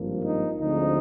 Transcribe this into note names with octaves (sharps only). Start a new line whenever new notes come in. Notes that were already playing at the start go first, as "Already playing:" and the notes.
Already playing: G#1 G2 F3 A#3
D#4
D2 D3 F3 G#3 C4 D#4